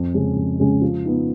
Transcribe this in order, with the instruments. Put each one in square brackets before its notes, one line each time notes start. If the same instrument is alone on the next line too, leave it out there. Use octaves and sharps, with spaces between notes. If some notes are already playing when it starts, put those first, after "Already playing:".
Already playing: [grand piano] F2
C#3 G#3 C#4 G#4
F2
C#3 G#3 C#4 G#4
F3
B3 D#4